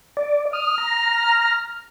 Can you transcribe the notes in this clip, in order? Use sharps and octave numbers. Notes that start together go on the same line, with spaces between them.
D5
D#6 F6
A#5